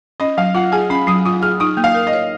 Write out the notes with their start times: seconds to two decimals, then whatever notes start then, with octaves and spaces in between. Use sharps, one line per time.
0.20 C#4 D#5
0.37 F#3 F5
0.55 F4 F#5
0.72 G#4 G#5
0.90 C#4 B5
1.07 F#3 D#6
1.25 F4 D#6
1.42 G#4 F6
1.60 D#4 D#6
1.77 A#3
1.84 F5
1.94 A#4
2.07 D#5
2.13 C#5